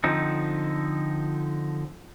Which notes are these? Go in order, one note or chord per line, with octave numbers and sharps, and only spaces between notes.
D3 F3 C4 D#4